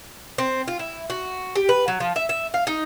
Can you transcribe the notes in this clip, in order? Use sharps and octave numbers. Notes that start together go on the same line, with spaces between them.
C4
F4
E4
F#4
G4
B4
F#3
F3
E5
E5
F5
D#4